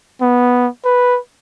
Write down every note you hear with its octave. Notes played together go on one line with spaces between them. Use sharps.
B3
B4